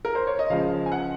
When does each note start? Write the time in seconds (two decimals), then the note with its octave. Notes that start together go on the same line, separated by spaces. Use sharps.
0.05 A#4
0.15 C5
0.27 C#5
0.39 D#5
0.50 C#2 C#3 F3 G#3 F5
0.86 G#5
0.92 F#5